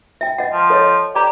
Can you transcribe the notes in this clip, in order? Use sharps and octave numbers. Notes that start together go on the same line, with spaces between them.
E5 G5
D#5 F#5
F3
A4 C#5 D#5
G4 D5 A#5